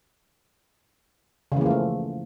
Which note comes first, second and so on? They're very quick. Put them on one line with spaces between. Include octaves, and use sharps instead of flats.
C#3 E3 A#3 F3 A3